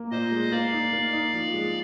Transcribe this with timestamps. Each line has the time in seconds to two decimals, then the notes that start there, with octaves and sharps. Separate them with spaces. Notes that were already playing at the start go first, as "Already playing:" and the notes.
Already playing: A#3
0.11 A#2 C5 D#5
0.31 G#3
0.52 A#3 D5 F5
0.72 D#4
0.92 A#3
1.13 D#4
1.33 F3
1.53 G#3